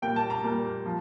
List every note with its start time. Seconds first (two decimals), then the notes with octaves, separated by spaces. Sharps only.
0.02 A#2 G3 A#3 G5
0.16 A5
0.30 A#5
0.44 A#2 G3 A#3
0.86 F3